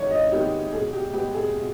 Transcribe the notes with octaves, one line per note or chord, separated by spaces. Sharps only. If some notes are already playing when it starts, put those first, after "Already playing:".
Already playing: E2 D#3 G#3 C#5
D#5
D#3 G#3 B3 G4
B2 G#4
G4
G#3 B3 G4
G#4
B2